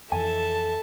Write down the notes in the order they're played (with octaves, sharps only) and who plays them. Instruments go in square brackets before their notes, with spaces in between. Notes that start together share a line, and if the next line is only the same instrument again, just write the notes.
[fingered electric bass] F2 E3 [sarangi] A4 [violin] E5 A5 [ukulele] G#5